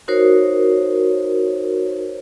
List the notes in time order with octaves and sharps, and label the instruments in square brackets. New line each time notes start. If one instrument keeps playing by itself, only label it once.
[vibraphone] D#4 F#4 A#4 C5 C#5